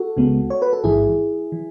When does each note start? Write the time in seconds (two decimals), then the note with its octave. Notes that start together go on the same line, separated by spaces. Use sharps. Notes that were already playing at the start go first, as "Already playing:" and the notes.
Already playing: F#4 A4
0.17 C#2 C#3 G#3 B3
0.50 C#5
0.62 B4
0.73 A4
0.84 A1 G#2 E3 E4 G#4
1.52 E3